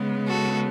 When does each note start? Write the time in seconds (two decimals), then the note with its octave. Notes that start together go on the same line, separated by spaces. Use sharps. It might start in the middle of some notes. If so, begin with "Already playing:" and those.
Already playing: C#3 G#3 B3
0.27 F#4 A4